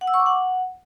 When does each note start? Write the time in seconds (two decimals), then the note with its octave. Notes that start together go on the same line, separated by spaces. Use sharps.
0.01 F#5
0.07 E6
0.14 C#6
0.20 D6
0.26 F#5